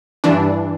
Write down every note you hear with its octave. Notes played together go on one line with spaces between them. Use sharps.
G2 E3 D4